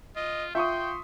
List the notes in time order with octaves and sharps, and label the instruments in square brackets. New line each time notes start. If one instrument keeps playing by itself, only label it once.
[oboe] F4 [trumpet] D#5
[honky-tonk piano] F4 [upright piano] E5 C#6 D#6 [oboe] G5 [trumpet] C6